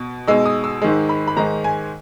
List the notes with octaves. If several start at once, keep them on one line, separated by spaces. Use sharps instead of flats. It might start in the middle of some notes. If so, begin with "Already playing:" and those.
Already playing: B2
B2 G#3 D#4 E6
D#6
E6
G#2 D#3 G#3
B5
B5
G#2 D#3 G#3 A#5
G#5